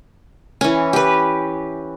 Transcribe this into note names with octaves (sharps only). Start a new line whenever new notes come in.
E3 C#4
G4 B4